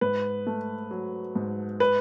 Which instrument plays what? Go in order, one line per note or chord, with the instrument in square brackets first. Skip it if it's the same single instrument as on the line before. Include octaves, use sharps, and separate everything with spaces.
[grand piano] G#2 B4
A3
F#3
G#2
B4